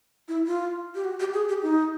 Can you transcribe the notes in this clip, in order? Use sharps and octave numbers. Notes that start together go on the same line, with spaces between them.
E4
F4
G4
F#4
G4
G#4
G4
D#4